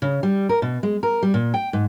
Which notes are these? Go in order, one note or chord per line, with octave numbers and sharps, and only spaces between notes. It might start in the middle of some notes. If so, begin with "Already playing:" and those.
C#3
G3
A#4
B2
G#3
A#4
G3
A#2
G5
G#2